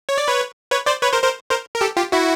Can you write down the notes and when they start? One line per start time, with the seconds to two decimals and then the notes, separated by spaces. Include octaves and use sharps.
0.09 C#5
0.18 D5
0.28 B4 C#5
0.71 B4 C#5
0.86 C5 D5
1.03 B4 C#5
1.12 A#4 C5
1.23 A#4 C5
1.50 A#4 C5
1.74 A#4
1.81 G4 A4
1.97 F4 G4
2.12 E4 F#4